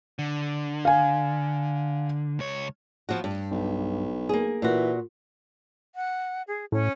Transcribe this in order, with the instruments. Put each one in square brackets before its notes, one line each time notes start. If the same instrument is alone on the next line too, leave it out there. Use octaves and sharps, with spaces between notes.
[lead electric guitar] D3
[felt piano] F5 G#5
[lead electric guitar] C#2 C#5
[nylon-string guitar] F3 B3 F#4
G2
[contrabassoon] B1
[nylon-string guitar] A#3 G#4
[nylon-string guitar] A#2 F#4 [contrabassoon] E3
[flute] F#5
G#4
[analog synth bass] A2 [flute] C#4